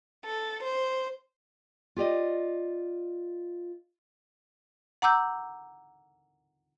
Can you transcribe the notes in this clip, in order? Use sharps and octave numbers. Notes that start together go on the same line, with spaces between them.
A4
C5
F4 G4 D5 D#5
F#5 A#5 D6 E6 G6